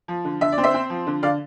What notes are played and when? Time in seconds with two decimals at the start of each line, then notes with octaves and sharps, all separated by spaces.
0.08 F3
0.25 D3
0.41 D3 E5
0.52 D5
0.58 C4
0.64 C5 E5
0.74 C4
0.90 F3
1.07 D3
1.23 D3 D5 F5